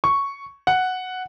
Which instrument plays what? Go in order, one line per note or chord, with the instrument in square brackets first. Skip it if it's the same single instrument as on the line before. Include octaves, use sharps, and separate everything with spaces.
[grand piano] C#6
F#5